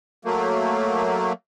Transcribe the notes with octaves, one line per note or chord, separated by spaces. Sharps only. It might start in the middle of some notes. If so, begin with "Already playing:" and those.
F#3 A3 A#3